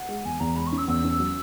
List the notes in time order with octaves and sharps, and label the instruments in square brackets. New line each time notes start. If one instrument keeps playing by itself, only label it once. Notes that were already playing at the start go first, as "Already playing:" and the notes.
Already playing: [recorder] F#5
[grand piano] G#3
[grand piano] E2 [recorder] G#5
[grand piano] E2 [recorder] A#5
[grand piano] G#3 [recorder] B5
[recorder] C#6
[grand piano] C#4
[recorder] E6
[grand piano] E2 [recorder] E6
[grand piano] C#4
F#3